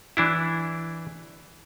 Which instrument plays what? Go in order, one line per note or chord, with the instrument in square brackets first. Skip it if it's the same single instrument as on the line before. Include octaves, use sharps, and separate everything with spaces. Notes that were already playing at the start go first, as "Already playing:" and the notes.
[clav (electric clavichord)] E3 D4 E4